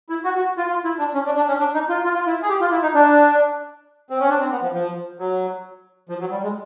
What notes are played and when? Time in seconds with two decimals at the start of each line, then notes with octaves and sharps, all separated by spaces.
0.09 E4
0.24 F#4
0.35 F#4
0.57 F4
0.69 F4
0.84 E4
0.99 D4
1.14 C#4
1.25 D4
1.37 D4
1.48 C#4
1.59 D4
1.74 D#4
1.89 F4
2.04 F4
2.15 F4
2.27 E4
2.42 G#4
2.49 G4
2.61 F4
2.72 E4
2.83 D#4
2.94 D4
4.10 C4
4.20 C#4
4.29 D4
4.40 C4
4.52 B3
4.63 F3
4.74 F3
5.19 F#3
6.09 F3
6.20 F#3
6.31 G3
6.43 G#3